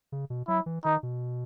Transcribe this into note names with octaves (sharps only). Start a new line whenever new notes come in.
C#3
B2
F#3 E4
E3
D#3 D#4
B2